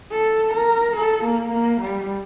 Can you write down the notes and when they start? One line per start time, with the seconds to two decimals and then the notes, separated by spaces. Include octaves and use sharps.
0.11 A4
0.53 A#4
0.96 A4
1.24 A#3
1.52 A#3
1.81 G3